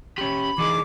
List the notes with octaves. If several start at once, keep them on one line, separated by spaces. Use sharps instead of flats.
C#4 G4 B5
E3 D#4 G#4 D6